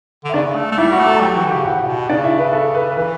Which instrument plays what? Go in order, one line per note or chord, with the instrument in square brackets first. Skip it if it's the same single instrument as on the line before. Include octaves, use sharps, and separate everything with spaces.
[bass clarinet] D3
[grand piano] E5
[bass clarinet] C#3 [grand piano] D4 D5
[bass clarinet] A3
A3
[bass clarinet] G3 [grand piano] E4 E5
[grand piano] F#4 F#5
[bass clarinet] A3
[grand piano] A4 A5
A5
[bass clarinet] F#3 [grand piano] G4 G5
[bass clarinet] E3 [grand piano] F#4 F#5
[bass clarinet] D3
[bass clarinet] C#3 [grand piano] G4 G5
[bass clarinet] A2 [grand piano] F#4 F#5
[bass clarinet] C#3
B2
[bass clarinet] C#3 [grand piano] D4 D5
[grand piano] E4 E5
B4
A4
B4
[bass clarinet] E3 [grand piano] B4